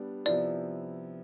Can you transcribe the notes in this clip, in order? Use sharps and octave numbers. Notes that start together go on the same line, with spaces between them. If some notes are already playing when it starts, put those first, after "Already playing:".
Already playing: G3 B3 D4
C3 F3 B3 E4 D5